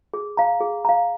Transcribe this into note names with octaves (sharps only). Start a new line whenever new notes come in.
G#4
F5 A#5
G#4
F5 A#5